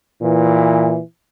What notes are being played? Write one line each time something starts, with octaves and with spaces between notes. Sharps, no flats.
A#2 E3